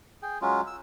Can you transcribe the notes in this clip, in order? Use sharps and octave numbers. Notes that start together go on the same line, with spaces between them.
G#4 G5
F#3 G#3 C#4 F4
E6